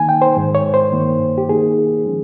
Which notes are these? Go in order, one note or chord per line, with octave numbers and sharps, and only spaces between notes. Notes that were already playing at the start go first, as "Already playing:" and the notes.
Already playing: D#3 A#3 D#4 G#5
G5
C5
G#2 D#3 G#3
C#5
C5
G2 D#3 A#3
G4
D#3 A#3 D#4 G#4
F3 G#3 C#4